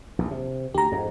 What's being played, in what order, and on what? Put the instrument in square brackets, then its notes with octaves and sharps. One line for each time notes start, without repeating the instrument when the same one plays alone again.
[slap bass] A#1 D#2
C3
[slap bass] D2 [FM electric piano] G4 A#5
[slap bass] F2 G#2